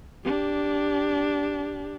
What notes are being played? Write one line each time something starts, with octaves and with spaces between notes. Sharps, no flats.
D4 G4